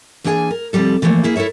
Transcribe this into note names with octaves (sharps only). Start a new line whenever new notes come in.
E3 A#3 D4 G#4 G5 G#5
A#4
C3 E3 F3 G3 A4
D3 E3 F3 A3 A#3
A#3 E4 G#4
E4 A4 A#4 C#5 E5